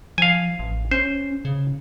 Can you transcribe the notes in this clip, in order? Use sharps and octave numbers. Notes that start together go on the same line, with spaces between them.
F3 F5 G#5
A1
C#4 C5
C#3